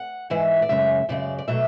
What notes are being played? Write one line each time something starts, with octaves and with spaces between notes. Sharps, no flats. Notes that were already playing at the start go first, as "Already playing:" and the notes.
Already playing: F#5
G#2 E3 G#3 E5
D5
F#2 C#3 G#3 E5
F#2 C#3 G#3 D5
D5
B2 F#3 A3 E5